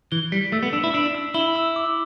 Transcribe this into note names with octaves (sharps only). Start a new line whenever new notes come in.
E3 G7
G3 B6
A3 E6
B3
D4 E6
E4
D4 E6
E6
E4 G7
E6
D6